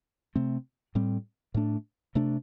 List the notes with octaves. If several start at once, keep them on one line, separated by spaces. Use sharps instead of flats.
C3 A3 C4
A2 G3 C4
A2 A3 D4
C3 A3 D4